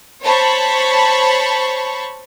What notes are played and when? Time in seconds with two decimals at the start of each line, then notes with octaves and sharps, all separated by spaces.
0.22 C5 C#5 A5 B5 C#6